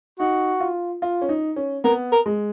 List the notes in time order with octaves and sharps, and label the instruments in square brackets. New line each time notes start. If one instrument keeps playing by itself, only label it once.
[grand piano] D#4 [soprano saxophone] F#4
[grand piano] F4
F4
C#4
D#4
C#4
[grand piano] B3 [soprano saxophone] A#4
[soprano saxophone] A#4
[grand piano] G#3